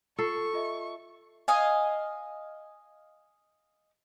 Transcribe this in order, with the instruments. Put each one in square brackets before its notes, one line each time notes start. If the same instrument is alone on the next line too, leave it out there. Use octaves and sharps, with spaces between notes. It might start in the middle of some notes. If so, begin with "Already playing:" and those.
[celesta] F4 C7 [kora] A4 [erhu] C#6
[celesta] F4 D#5 E5
[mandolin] D#5 F5 G#5